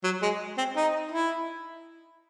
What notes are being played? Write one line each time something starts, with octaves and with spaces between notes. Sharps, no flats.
F#3
G#3
C4
D#4
E4